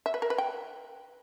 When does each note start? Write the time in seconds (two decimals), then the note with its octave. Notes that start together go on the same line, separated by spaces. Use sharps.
0.06 E5
0.14 B4
0.22 A#4
0.30 B4
0.38 G5